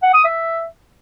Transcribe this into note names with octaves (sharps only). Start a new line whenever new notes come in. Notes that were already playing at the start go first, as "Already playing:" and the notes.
F#5
D#6
E5